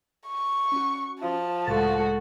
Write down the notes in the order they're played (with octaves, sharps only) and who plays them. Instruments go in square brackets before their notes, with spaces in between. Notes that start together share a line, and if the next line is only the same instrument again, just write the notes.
[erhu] C#6
[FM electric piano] C#4 F#4
[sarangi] F3 [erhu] A5
[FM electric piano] C#2 A2 A6 [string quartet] G#3 A3 F#4